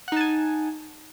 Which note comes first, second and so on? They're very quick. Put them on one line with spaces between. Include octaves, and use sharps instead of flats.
F#5 D#4 A5 G#5